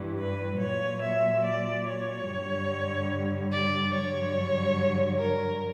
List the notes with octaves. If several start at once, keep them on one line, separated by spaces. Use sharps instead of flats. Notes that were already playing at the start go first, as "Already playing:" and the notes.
Already playing: G2 E3 G3
B4
A#2 F#3 C#5
E5
D5
C#5
G2 D3 G3
D5
G2 D3 F#3 C#5
A#4